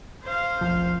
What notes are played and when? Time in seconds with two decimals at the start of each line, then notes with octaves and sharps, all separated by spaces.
0.23 C5 F5
0.61 F1 B1 F3